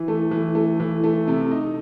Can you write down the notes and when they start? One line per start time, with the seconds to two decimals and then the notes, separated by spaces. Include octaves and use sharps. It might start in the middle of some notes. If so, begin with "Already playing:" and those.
Already playing: E3
0.08 A3
0.31 E3
0.55 A3
0.80 E3
1.04 A3
1.28 C3
1.51 D#4